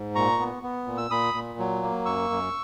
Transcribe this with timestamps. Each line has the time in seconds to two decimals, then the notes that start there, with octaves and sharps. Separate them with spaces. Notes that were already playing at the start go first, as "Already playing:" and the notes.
Already playing: G#2
0.15 A#2 A#5 C#6
0.40 B3
0.63 B3
0.86 A#2
0.98 E6
1.10 A#2 B5 D#6
1.34 A#2
1.59 F#3
1.83 A#3
2.06 F#2 C#6 E6
2.30 F#2